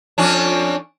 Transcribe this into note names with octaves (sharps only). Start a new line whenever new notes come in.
F2 C#4 D4